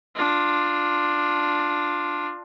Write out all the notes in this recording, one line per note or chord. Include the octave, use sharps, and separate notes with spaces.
D4 F4